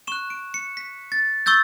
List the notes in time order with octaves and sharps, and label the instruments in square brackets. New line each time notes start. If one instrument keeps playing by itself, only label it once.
[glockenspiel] C#6 F#6 E7
D7
C#7
B6
A6
C#6 E6 G6 A6